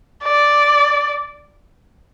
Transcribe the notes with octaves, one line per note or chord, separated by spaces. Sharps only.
D5